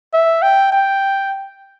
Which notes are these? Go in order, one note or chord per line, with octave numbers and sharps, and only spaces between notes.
E5
G5
G5